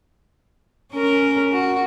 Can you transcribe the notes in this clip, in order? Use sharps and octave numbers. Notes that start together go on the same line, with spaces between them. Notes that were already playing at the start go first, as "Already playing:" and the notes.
C#4 A#4
F#4